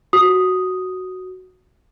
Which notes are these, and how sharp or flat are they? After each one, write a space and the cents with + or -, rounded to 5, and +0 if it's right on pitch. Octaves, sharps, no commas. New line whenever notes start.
F#4 +0 D#6 +0